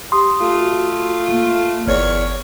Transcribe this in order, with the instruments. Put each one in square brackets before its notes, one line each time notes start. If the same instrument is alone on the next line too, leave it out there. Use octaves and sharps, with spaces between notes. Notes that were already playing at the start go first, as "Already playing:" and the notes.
[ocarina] G4 [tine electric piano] C6 D#6
[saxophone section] A3 F4
[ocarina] F#4
A#3
[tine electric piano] G1 [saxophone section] E2 A#4 C#5 [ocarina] D5